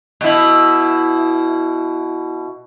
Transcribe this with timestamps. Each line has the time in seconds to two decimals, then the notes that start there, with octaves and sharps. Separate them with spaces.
0.21 B2 E4